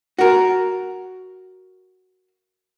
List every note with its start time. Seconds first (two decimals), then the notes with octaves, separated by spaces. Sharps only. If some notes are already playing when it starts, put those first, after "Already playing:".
0.18 F#4 A#4